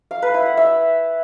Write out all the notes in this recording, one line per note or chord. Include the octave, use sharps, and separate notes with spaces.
F5
B4
E4
F#5
E5